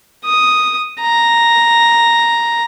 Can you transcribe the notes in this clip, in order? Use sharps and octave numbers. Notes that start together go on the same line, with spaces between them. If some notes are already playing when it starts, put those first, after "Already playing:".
D#6
A#5